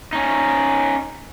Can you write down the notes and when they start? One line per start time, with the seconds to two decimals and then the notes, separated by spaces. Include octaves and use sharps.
0.13 C#4 D#4